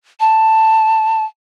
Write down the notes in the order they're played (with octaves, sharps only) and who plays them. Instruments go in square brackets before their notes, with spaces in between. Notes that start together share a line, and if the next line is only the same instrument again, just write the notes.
[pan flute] A5